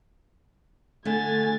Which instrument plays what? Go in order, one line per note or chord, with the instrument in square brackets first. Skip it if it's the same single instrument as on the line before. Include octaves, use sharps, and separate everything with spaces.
[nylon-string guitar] D3 A3 [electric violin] G#5 A6